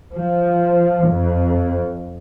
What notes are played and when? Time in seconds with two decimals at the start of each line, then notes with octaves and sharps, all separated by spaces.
0.13 F3
1.08 F2